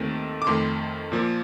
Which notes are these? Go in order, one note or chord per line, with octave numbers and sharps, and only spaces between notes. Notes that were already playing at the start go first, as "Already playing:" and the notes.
Already playing: D#2 D#3 A3 C4
D6
F2 D#3 A3 C6
A#2 F3 A#3